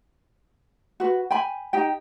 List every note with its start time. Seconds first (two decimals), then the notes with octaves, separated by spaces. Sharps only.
1.00 F#4 B4
1.31 G5 G#5 B5
1.73 D#4 G4 G5